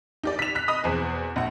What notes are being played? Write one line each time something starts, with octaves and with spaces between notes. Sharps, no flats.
D#4 G4 D5
B6 F7
F#6 B6
D#5 B5 D#6
E2 B2 C4 G#4
A#1 F#5